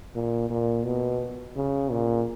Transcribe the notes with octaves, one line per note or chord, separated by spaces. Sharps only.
A#2
A#2
B2
C#3
A#2